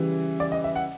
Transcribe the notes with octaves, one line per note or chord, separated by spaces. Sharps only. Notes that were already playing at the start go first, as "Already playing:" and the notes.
Already playing: C#3 E3 G3
D5
D#5
E5
F#5